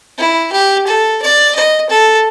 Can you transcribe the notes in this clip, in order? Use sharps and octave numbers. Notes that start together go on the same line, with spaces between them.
E4
G4
A4
D5
D#5
A4